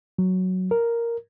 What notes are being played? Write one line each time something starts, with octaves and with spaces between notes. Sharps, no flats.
F#3
A#4